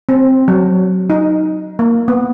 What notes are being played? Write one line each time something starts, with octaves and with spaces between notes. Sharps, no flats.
C4
F#3
D#4
A#3
B3